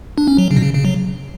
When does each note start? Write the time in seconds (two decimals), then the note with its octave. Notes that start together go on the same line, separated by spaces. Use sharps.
0.18 D4
0.28 C#4
0.38 F#3
0.51 C#3
0.56 B2
0.62 C#3
0.74 C#3
0.85 F#3